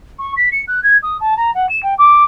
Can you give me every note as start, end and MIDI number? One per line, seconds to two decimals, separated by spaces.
0.19 0.33 85
0.36 0.49 95
0.52 0.63 97
0.67 0.82 90
0.83 0.97 92
1.03 1.18 87
1.20 1.37 81
1.37 1.53 82
1.54 1.66 78
1.69 1.80 100
1.83 1.94 79
1.98 2.24 86